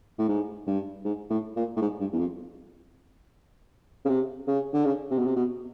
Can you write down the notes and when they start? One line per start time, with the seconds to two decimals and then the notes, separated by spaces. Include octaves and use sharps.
0.18 A2
0.28 G#2
0.67 G2
1.04 G#2
1.30 A2
1.56 A#2
1.76 A2
1.81 G#2
2.00 G2
2.13 E2
2.19 F2
4.05 C#3
4.09 C3
4.47 C#3
4.73 D3
4.85 C#3
5.11 C3
5.19 B2
5.26 C3
5.36 B2